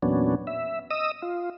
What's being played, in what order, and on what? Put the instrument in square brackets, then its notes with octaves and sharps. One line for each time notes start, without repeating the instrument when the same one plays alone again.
[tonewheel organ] E2 A#2 F#3 B3 C#4 D4
E5
D#5 D#6 E6
F4